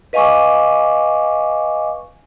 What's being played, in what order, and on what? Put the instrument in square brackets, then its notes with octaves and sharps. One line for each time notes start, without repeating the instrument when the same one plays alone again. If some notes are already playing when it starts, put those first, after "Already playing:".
[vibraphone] B4 D#5 F5 G#5 C#6 D6